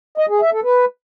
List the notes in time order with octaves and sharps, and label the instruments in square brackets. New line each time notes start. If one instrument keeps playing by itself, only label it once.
[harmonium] D#5
G#4
E5
A4
B4